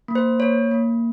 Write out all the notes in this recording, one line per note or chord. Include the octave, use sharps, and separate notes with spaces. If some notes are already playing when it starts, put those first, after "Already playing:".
A#3
C5
A#3 C#5
A#3